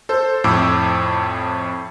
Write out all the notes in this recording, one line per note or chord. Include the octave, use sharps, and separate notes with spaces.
A4 C5
F2 A2 D6 E6